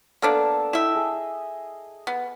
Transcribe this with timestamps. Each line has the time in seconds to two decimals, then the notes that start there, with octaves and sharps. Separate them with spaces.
0.22 A#3 B3 D4 A4 A5 D6
0.73 E4 D#5 E5 G5
0.95 G#4
2.07 B3